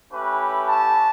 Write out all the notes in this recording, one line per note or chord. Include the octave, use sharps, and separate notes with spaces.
A3 C#4 E4 G4 B4
A5